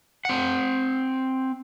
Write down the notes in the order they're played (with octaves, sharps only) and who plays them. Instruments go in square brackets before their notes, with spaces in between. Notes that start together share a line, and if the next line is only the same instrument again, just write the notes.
[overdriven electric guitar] C4 F#5